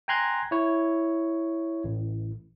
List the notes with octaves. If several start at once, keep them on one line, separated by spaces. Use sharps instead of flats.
G5 G#5 A#5 C6 F#6 G#6
E4 C#5
A1